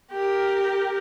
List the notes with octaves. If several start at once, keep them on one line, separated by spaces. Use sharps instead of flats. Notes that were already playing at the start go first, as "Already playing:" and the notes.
G4 A#4